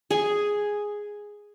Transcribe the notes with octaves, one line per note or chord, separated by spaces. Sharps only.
G#4 G#5